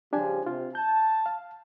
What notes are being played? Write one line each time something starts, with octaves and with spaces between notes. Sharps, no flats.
C#3 F3 G3 D4 G4 G#5
C3 F4
A5 G6
F5